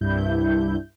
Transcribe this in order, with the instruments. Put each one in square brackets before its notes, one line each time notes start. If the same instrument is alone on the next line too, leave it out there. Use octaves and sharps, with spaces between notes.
[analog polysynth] C2 G2 E4 G6